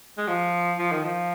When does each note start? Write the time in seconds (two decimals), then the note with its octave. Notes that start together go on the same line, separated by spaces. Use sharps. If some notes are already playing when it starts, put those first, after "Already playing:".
0.17 G#3
0.28 F3
0.79 F3
0.92 D#3
1.04 F3